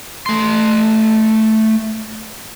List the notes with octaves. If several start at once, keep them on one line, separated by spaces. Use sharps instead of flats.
A3 C6